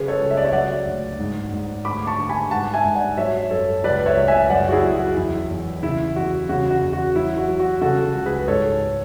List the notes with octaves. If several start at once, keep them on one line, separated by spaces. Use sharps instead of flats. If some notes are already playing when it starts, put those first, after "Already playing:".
Already playing: C#3 F#3 G#4 B4
A4 C#5
C#2
E5
D5
C#5 E5
F#3 D5 F#5
D2
G#2
G#2
D2 B5 D6
A5 C#6
D3
G#5 B5
G#2 F#5 A5
E5 G#5
G#2
D5 F#5
F#3 C#5 E5
F#2 A4 C#5
C#2 B4 D5
C#5 E5
C#2
E5 G#5
F#2 D5 F#5
F#4
E4 G#4
F#2
F#4
E2 E4
E2
C#3 E4
E2 F#4
C#3 F#4
F#4
E2
F#4
F#3 E4
F#4
F#3
F#4
C#3 F#4 A4
C#2
G#4 B4
G#2 A4 C#5